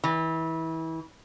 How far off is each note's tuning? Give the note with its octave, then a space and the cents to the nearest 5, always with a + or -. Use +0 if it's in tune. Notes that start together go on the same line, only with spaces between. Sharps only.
E3 -25